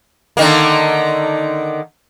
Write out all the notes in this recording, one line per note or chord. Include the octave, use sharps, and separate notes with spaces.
D3 D#3 A#3